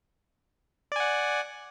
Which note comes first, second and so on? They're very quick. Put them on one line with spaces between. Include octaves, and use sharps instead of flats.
D5 G#5 F#5